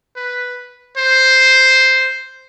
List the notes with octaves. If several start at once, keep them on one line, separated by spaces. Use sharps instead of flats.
B4
C5